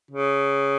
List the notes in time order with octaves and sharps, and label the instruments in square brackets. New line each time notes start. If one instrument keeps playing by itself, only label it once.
[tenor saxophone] C#3